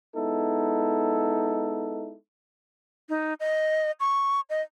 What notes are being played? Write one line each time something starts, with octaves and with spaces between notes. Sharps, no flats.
G#3 B3 D#4 E4 A4
D#4
D#5
C#6
D#5